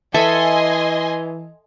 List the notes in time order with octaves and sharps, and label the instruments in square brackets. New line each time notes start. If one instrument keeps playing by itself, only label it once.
[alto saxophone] E3 [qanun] A4 E5 F#5 [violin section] D#5 G#5 C6